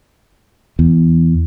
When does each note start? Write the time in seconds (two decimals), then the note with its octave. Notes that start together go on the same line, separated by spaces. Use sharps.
0.79 E2